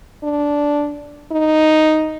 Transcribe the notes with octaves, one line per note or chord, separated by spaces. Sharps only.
D4
D#4